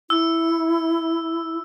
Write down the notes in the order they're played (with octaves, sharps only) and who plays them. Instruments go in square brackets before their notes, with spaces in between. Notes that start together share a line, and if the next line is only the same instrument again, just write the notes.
[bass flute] E4 [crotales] E6